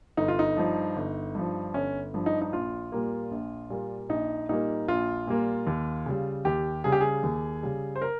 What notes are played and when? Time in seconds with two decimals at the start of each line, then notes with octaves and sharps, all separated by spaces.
0.17 G1 D#4
0.28 F4
0.39 D#4
0.57 G2 F3
0.96 G1
1.35 G2 F3
1.74 G1 C#4
2.14 G2 F3
2.26 D#4
2.42 D#4
2.53 A#1 F4
2.92 A#2 G3 A#3
3.31 A#1
3.70 A#2 G3 A#3
4.09 A#1 D#4
4.49 A#2 G3 A#3 D#4
4.88 A#1 F4
5.27 A#2 G3 A#3
5.67 D#2
6.06 C#3 G3
6.45 D#2 G4
6.84 C#3 G3 G#4
6.92 G4
7.01 G#4
7.23 D#2
7.63 C#3 G3
7.96 C5
8.02 A#4